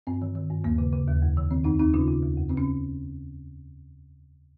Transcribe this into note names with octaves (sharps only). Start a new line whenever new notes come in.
G2 C4
D#3
D#3
G2
D#2 A#3
C#3
C#3
D#2
F2
D#3
D#3 C4
F2 C4 D#4
D#2 C4 D#4
C#3 C#4 F4
C#3
D#2
F2
C#3 C4
C#4